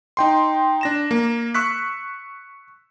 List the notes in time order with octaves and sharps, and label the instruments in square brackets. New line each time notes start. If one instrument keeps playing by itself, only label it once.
[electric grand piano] D#4 G5 C6
D4 A#6 E7
A#3
C#6 E6 F#6 B6